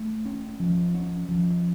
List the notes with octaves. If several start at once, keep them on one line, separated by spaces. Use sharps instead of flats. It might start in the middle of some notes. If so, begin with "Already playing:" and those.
Already playing: A3
C#4
F3
C#4
F3